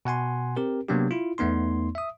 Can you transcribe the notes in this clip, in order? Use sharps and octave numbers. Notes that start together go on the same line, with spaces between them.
B2 F#5 G#5 C6
C4 G4 A#4
C3 F#3 A#3 B3 D4 G4
E4 F4
E2 A3 B3 D#4 C6
E5 D#6